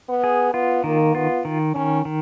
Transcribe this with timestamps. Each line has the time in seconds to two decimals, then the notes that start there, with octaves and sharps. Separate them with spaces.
0.09 B3
0.24 G#4
0.53 B3 F4
0.84 D#3 A#3
1.14 B3 F4
1.45 D#3
1.74 D#3 C#4
2.05 D#3